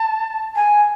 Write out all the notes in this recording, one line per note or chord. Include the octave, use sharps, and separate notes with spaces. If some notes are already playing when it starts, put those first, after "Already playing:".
Already playing: A5
G#5